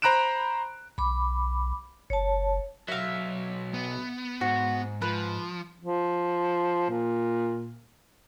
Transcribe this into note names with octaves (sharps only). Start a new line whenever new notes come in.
C5 A#5 B5 F#6 D7 E7
B1 B5 D6
F#1 C#5 A5
B1 F#3 E5 F5
B3
G#2 F#4
F3 B4
F3
A#2